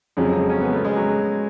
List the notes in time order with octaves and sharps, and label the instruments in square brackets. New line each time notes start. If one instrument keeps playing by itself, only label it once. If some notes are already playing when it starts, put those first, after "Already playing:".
[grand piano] F2 C#3 F#3 [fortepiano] F3 G#3
[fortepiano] C#4
B3
A3
G#3
F#3